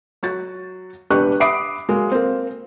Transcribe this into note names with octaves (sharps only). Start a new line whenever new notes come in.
F#3 F#4 A6
E1 D4 G4 B4 C#6 F#6
E5 B5 D6 D#6 C7 D7
F#3 G#3 A#3
A#3 C4